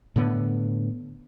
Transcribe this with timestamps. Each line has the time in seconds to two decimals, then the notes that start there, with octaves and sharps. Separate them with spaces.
0.16 A2 D3 B3